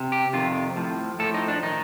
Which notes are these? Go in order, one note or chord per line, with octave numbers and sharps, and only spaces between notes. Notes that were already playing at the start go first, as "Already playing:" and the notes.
Already playing: C3
G4
F2 C3 D#3 F4
A2 F3
A2 F3 A4
D#4
D4
D#3 D#4